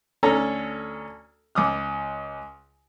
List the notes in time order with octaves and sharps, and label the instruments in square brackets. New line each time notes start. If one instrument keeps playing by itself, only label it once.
[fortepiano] D2 C#4 A4 A#5
C#2 D6 D#6 F6